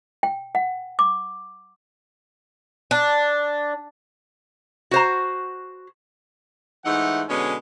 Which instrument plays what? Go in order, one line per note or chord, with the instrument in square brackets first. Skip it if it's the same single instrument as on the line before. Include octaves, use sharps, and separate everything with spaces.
[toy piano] G5
F#5
D6
[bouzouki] D4
[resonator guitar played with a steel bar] F#4 C5 A#5
[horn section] G#2 E3 A3 D#4 F#5
B2 D3 G#3 C#4